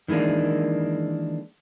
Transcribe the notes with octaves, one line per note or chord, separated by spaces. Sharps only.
D#3 E3 G#3 A#3 D4